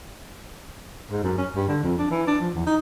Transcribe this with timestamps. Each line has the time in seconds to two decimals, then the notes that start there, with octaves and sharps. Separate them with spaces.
1.10 G#2
1.23 F#2
1.38 C#4
1.55 G2
1.69 D3
1.83 F2
1.98 D4
2.10 E3
2.27 D4
2.41 F3
2.54 E2
2.67 D#4